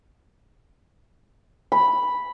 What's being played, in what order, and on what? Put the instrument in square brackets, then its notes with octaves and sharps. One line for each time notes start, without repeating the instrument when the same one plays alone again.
[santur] B5